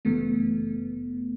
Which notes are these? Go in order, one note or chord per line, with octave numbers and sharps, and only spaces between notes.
G1 F#2 C#3 E3 A3 B3